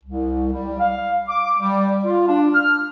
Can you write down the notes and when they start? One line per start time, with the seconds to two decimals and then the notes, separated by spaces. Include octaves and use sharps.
0.04 C2
0.53 G3
0.79 F5
1.29 D6
1.59 G3
2.04 F4
2.28 D4
2.54 F6